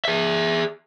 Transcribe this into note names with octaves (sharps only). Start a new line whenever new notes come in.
G#4 E5